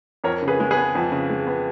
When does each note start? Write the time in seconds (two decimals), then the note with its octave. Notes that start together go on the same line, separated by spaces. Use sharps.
0.24 F2 A#4 C#5
0.42 C#3
0.48 G#4 B4
0.60 G#3
0.71 G#4 B4
0.77 B3
0.95 F2
1.12 C#3
1.30 G#3
1.47 B3